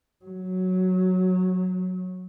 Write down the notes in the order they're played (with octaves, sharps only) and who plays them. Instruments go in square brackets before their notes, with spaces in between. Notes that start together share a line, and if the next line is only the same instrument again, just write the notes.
[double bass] F#3